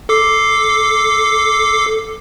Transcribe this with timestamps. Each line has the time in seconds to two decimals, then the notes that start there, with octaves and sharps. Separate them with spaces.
0.09 A4 D6 C7